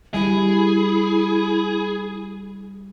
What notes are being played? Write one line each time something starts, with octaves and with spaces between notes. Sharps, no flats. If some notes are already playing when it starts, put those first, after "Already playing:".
G3 E4 G#4